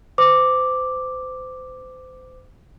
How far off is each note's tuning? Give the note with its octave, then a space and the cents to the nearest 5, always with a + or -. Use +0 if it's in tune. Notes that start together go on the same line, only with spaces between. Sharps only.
C5 -35 D6 +0